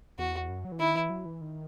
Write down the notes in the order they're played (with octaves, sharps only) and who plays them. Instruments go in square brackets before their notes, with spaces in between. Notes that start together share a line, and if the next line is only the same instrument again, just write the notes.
[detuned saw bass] E2 [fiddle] F#4
[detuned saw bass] F#2
F#3
E3
[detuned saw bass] D#3 [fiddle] E4
[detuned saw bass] E3
F#3
E3
D#3